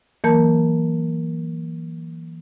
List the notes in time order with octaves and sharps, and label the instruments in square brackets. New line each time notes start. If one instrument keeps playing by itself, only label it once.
[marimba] E3 F#3 A#3 A#4 A5 G6